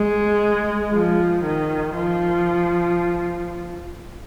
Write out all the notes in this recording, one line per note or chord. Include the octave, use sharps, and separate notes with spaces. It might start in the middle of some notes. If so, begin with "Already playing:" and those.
Already playing: G#3
F3
D#3
F3